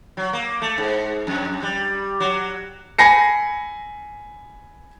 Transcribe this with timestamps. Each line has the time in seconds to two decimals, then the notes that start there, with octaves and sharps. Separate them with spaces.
0.17 F#3
0.33 A#3
0.62 A3
0.78 G#2
1.27 F2
1.62 G3
2.20 F#3
2.98 G#5 B5 A#6 C7 C#7